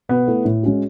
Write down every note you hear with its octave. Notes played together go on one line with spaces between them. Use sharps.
B2 B3
A3 E4 A4
A2
G#3 C#4 F#4